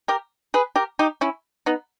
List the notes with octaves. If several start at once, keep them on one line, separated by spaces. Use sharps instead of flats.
G4 A#4
G#4 B4
G4 A#4
D#4 G4
C#4 E4
B3 D#4